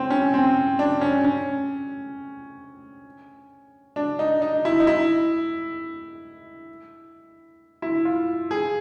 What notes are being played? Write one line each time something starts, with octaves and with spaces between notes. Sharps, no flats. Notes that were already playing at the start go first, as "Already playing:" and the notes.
Already playing: C4 C#4
C#4
C4
D4
C#4
C#4
D4
D#4
D#4
E4
D#4
E4
E4
F4
G#4